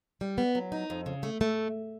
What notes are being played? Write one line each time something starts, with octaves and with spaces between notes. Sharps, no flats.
G3
B3
F#3
D#4
F2
C#3
A3
A3